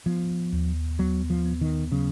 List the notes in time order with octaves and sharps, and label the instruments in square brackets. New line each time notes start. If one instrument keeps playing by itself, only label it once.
[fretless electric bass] F3 [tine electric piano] B3
[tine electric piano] D#2
[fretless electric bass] F#3 [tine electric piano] B3
[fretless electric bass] F3
[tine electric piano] B3
[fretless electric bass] D#3
[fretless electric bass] C#3 [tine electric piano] F#3